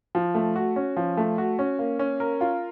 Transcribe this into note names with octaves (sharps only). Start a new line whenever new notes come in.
F3
A3
F#4
C#4
F3
A3
F#4
C#4
A#3
C#4
A#4
F4